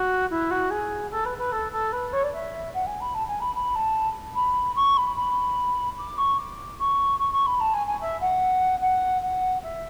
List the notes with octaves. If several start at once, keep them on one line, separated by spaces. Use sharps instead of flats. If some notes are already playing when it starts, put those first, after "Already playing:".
Already playing: F#4
E4
F#4
G#4
A4
B4
B4
A4
A4
B4
C#5
D5
E5
F#5
G#5
B5
A5
G#5
B5
B5
A5
B5
C#6
B5
B5
D6
C#6
D6
C#6
C#6
C#6
B5
A5
G#5
G#5
E5
F#5
F#5
F#5
E5